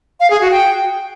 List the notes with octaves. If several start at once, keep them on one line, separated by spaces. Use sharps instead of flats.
F5
G#4
F#4
G5